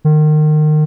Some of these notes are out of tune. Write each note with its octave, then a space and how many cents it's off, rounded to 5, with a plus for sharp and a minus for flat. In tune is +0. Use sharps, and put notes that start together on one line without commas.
D#3 -30